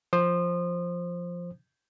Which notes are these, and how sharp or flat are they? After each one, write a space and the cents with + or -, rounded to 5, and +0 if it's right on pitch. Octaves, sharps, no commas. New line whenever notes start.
F3 +0 C5 +10 D#6 -30